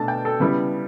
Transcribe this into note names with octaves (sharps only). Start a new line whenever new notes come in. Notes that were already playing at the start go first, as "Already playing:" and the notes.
Already playing: B2 A3 D4 A5
G5
A4
C#3 G3 B3 E4 B4